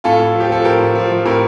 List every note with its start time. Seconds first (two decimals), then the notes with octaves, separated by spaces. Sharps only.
0.04 A2 F4 A4
0.20 A2
0.35 F3
0.40 G4
0.49 F3 A4
0.65 A2 G4 A#4
0.80 A2
0.95 F3
1.11 F3
1.26 A2 G4 A#4